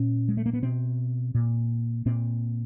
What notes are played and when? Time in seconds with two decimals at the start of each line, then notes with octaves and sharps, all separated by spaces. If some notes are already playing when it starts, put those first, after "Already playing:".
Already playing: A#2 C#4
0.29 G#3
0.37 A3
0.46 A#3
0.53 B3
0.62 B2 C4
1.35 A#2
2.06 A#2 C4